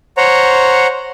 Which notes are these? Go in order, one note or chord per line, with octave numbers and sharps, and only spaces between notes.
C5 C#5 F#5 A#5